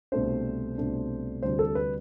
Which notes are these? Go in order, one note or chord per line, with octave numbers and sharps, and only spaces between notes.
C2 B2 A3 D4 C5
C2 B2 A3 D4
D2 C3 G3 D4 C5
A4
B4